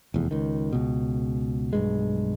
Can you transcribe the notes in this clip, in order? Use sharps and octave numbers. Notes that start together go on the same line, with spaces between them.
F1 E2
C#2 D#3
C#2 B2
B1 G2 G#3